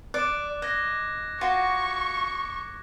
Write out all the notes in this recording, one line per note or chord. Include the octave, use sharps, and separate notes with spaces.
D5 D6 F#6
D#5 F#6 G#6 A#6
F4 F#4 C#6